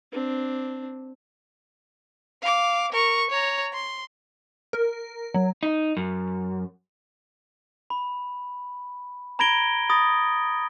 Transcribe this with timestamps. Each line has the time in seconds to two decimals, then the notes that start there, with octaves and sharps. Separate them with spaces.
0.12 C4 D4
2.42 F5 D6
2.92 A#4 C#6
3.31 C#5 A#5
3.73 C6
4.73 A#4
5.34 F#3
5.63 D#4
5.97 F#2
7.90 B5
9.39 A#5 B5 G#6 A#6 D7 G7
9.89 B5 D#6 A6 A#6